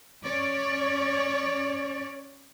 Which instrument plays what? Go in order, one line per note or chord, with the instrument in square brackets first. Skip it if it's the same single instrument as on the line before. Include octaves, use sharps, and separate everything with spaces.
[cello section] C#4 C#5 D5